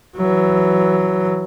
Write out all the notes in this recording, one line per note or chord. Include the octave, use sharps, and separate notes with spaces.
E3 F#3